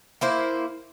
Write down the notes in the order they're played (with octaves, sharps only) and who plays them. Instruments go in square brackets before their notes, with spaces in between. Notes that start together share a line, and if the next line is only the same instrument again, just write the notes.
[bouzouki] A#3 E4 C5